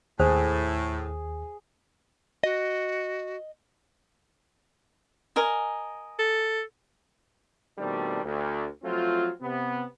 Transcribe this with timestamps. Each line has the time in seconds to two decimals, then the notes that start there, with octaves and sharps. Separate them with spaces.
0.20 D#2 A2 G#4 C5
2.44 F#4 D#5
5.36 A#4 D#5 G#5
6.19 A4
7.78 B2 D#3 G3 A3 C4 D4
8.24 D2
8.84 F3 F#3 A3 C4 F4
9.42 C3 B3